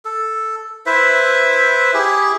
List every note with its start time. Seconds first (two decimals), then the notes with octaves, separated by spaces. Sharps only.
0.05 A4
0.86 E4 B4 C5 E5
1.94 E4 G4 G#4